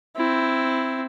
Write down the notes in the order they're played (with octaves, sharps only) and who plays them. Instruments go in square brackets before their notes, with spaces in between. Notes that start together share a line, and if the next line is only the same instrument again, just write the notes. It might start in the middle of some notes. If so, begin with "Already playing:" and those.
[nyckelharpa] C4 E4